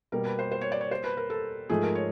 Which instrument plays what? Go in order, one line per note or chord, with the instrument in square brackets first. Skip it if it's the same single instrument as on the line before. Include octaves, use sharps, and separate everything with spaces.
[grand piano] B2 G3 A#3 [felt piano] A#4
[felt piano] B4
C5
C5
C#5
D5
C#5
C5
B4
A#4
A4
[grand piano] G#2 F3 A3 [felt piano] G#4
[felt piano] A#4
C#5